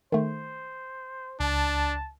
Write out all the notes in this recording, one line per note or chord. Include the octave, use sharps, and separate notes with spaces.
D#3 A3 C5
C#2 D4 A5